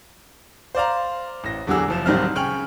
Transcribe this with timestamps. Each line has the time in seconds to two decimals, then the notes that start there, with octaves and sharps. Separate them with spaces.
0.75 C5 D5 F5 A#5
1.44 A1 A#6
1.67 E2 D3 F#3 G4 G#4 E6
1.88 F#1 F3 E7
2.06 D1 D#3 F#3 G3 C4 F6
2.35 C#3 G5 G#5 C#6 F6 F#7